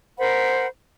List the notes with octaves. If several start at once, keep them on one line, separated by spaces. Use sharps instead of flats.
A#4 C5 F#5 B5